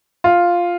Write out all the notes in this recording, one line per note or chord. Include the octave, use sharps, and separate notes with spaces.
F4